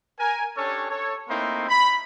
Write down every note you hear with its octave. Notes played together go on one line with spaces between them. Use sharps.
A#4 G#5
C#4 D4 G4 A4 C#5
A4 C#5
A3 A#3 C4 D#4 E4 C6
B5